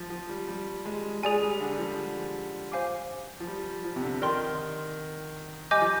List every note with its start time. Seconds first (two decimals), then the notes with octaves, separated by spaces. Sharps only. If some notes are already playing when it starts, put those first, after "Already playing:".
Already playing: F3
0.10 F3
0.29 G3
0.48 G3
0.85 G#3
1.23 G#3 G#4 D5 G#5
1.42 G3
1.60 D3
1.71 G3
1.78 F3
2.72 C5 F5 G#5 D6
3.40 F3
3.47 G3
3.84 F3
3.96 C3
4.03 D3
4.22 D#3 A#4 D5 G5 C6
5.71 G3 D#5 G#5 D6 G6
5.81 F3